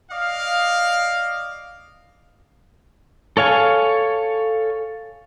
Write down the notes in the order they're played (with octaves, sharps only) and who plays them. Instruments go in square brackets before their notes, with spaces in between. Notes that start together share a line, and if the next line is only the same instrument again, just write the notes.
[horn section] D5 D#5 F5
[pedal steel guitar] A4 C#5 F5 G#5